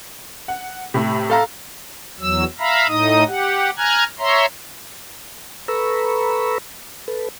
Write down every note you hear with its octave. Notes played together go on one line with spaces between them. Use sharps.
F#5
A2 C3
A4 F5 A#5
E2 F#3 E6
E5 F5 A#5 B5
A2 D#4 D#5 D#6
G4 F#5
G#5 A#5 F6 F#6 G#6
C#5 E5 A#5 C6
A4 B4 A#5 B5 C#6 E6
A4 B4